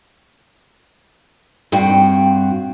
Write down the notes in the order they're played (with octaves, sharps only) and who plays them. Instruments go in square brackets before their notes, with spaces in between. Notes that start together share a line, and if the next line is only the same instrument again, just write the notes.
[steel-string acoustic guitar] G2 C4 F#4 G5